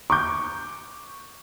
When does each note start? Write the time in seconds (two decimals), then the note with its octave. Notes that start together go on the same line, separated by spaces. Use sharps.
0.10 C#6 D6 G6